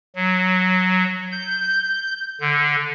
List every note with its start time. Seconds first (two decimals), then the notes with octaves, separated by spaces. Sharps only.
0.16 F#3
1.32 G6
2.41 D3